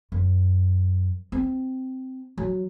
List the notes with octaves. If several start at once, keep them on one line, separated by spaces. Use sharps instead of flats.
F#2
C4
F#3